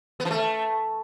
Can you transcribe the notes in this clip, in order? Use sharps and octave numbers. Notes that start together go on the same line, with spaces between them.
B3
F3
A3